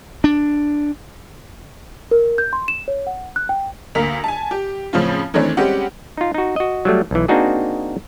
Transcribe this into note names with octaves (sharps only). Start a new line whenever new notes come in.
D4
A#4
G6
C6
E7
C#5
F#5
F#6
G5
D2 A#3 A#4 B6 F7
G#5 A5
G4
A2 C#3 F3 C4 C#4 F4
D#3 E3 A3 C4 D4 C#5
G3 G#3 C4 C#4 G4 F#5
D#4 F4
D#4 F#4
F#4 D#5
F#3 G3 A3
B1 E3
A#3 C4 D4 D#4 F#4 G#4